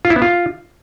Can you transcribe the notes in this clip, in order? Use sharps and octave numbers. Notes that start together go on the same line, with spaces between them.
F4
E4
B3
F4